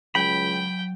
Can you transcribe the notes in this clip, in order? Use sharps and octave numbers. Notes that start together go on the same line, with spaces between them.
C#2 F#3 G5 B5